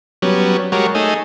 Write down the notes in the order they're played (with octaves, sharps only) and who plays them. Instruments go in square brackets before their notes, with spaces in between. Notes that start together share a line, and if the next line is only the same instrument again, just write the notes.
[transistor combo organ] F#3 G3 B3 C#4
G3 G#3 F#4 A#4 C#5
A3 D#4 G#4